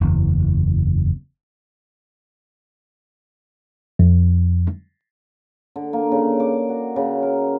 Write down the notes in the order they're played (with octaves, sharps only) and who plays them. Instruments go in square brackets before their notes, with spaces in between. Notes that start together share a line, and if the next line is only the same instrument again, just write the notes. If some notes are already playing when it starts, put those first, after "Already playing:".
[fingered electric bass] F#1 E2
[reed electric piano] F2
[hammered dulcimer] D3
A#3
C#3
D6
F#4
C#3
A#4